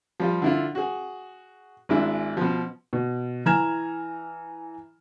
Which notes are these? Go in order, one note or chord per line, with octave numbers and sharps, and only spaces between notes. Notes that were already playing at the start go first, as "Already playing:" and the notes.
F3 G3 F4
D3 E4 F4
F#4 G#4
G#1 G#3 D4 E4
B2 F3
B2
E3 G#5 A#5 F6 G#6 E7